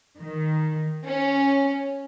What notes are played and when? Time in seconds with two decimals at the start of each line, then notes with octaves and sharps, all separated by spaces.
0.19 D#3
1.04 C#4